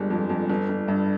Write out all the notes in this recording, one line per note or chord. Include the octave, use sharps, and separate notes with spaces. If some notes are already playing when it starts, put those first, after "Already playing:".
Already playing: G1 G3 G#3
F2
F2
G1
G1
G2